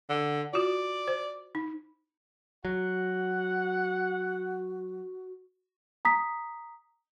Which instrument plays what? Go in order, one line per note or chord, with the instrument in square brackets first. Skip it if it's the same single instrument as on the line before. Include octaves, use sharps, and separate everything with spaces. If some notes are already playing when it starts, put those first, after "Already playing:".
[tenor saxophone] D3
[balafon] F4 F#4 [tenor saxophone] D5
[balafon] C5
D#4
[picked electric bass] F#3 [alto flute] F#4 [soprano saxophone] F#5
[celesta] A#5 D#6 B6